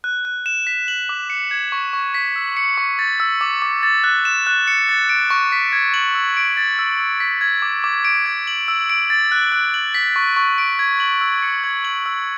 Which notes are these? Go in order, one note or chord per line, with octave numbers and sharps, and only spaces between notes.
F#6
F#6
E7
B6
F#7
D6
C#7
G#6
C#6
C#6
B6
E6
C#7
C#6
A6
E6
D6
D6
A6
F#6
E7
F#6
C#7
A6
D7
C#6
B6
G#6
F#7
E6
D7
A6
E6
E6
B6
G#6
D6
D6
D7
G#6
F#7
E6
D7
A6
F#6
F#6
F#7
B6
C#6
C#6
D7
G#6
F#7
E6
C#7
G#6
F#7
E6